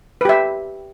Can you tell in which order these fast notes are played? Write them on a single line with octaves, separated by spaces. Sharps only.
B4 G4 E5